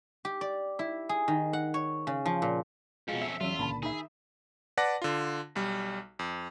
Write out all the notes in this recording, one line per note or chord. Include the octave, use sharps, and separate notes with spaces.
G4
D5
E4
G#4
D#3
F#5
C#5
C#3
F3
A#2
F2 B2 G#3 C#4 F4
E5 C7
E2 F#3 C#4 F4 D#7
C#2 A#2 D3 A5 B5
D#3 G#4 E5 B5 D#6
B4 D5 F#5 A5 D6 A#6
D3 F4
B1 G3
F2